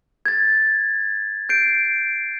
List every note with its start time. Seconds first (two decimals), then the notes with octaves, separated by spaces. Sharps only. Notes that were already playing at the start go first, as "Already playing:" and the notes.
0.26 G#6 A6
1.49 G6 C7 D7